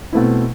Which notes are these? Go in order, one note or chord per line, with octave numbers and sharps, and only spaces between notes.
B2 A3 C4 E4